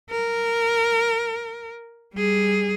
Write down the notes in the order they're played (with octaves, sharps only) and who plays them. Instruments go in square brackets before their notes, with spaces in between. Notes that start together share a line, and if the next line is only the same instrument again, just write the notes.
[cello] A#4
G3 G#4